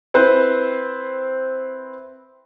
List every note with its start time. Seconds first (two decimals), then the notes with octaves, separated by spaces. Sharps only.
0.14 C4 E4 B4 C5